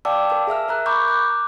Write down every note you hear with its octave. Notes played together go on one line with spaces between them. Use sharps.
D5 F5 G5 A5 D6 E6
A#4 A5
G#4 E5 E6 F6
A#4 A#5 F#6
A#5 B5 C#6 D6 G6
D6 F#6